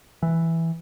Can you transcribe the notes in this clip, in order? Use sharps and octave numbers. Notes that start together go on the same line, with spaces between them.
E3